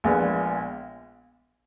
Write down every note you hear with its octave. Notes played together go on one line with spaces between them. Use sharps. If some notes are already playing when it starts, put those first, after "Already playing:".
A#1 A#2 G#3 B3